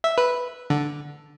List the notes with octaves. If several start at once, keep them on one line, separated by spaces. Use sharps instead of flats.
E5
B4
D3